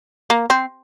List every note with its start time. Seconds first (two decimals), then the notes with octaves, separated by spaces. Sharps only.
0.30 A#3
0.50 C4